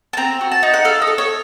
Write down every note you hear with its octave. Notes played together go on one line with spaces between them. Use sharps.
A5
C4 A#5
F#4
A5
D#4
F#5
A4 F5
D#5
A4
C#5